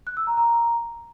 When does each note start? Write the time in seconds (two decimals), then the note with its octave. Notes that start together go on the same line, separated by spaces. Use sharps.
0.07 F#6
0.17 E6
0.27 A#5
0.37 A#5